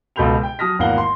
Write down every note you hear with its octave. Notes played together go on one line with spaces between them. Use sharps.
C#2 B2 A4 B5 G6 F7
G5
F#3 A5 D#6 F6 A#6 B6
G#1 E2 A#3 F5 F#5 G7
C6